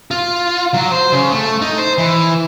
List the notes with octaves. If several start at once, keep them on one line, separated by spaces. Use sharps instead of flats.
F4
F#3
C5
C#3
A3
D#4
C5
E3